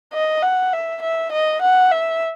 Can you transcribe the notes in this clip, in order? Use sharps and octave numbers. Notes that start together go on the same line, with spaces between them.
D#5
F#5
E5
E5
D#5
F#5
E5